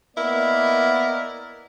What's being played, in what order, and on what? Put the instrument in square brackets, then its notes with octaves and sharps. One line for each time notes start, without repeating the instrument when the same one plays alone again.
[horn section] A#3 B3 E4 A#4 D5 D#5